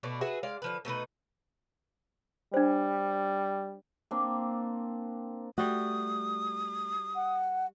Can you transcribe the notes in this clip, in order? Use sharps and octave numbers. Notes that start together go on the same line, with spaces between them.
B2 A3 D5
F#4 G#4 B4 E5
G#3 D5 F5
D3 F3 B4
B2 A3 D#4 B4
G3 D4 C5
A#3 C4 D4
G3 A3 F#4 D#6
F#5